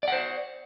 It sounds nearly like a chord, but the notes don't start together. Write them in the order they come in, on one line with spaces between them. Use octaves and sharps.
D5 F#5 C5